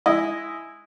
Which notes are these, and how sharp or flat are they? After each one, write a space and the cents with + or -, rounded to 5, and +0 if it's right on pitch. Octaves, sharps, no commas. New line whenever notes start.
G#3 +0 E4 +0 D#5 +0